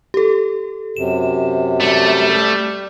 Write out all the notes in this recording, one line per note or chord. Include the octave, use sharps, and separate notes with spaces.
G4 A4
F#2 C3 E7
G3 A3